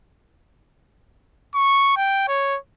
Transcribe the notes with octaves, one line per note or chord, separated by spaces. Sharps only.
C#6
G5
C#5